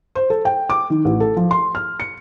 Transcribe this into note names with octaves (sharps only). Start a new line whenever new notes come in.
C5
A4
G5
D6
D#3
A1
A4
F3
C6
F6
C#7